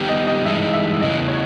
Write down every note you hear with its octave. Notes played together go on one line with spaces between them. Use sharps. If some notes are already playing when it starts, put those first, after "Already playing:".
Already playing: D#3 G3 B3 G4
D#5
D#5
G2 E3 G#3 D#4 E5
E5
E2 C#3 E3 D#5
C#5